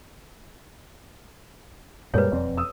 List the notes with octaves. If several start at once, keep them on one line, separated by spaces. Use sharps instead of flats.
F#2 A#2 G3 G#3 A#3 B4 C#5
E1 F2 C4 D5
D#6 E6